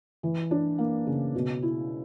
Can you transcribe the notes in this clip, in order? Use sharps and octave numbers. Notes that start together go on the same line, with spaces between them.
E3
D4
A#3
C#3
B2
E4